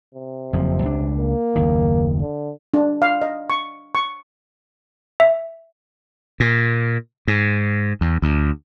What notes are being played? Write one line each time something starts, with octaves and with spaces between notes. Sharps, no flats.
C3
F#1 F2 F3
C#2 D4
A#3
F#1 D#2 D#3
D3
D4
F5
D#5
C#6
C#6
E5
A#2
G#2
E2
D2